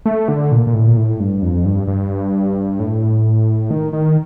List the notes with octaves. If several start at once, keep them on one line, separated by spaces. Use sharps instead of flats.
A3
D3
A#2
A#2
A2
A#2
A2
G2
F2
G2
G2
A2
D#3
D#3